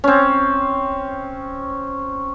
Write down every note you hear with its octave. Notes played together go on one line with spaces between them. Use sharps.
C4 C#4